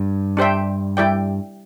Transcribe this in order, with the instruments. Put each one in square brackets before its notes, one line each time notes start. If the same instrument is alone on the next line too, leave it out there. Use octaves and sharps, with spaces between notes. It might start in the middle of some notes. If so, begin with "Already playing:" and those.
Already playing: [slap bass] G2
[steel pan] D4 G4 C5 E5 G5
G3 E4 G4 D5 G5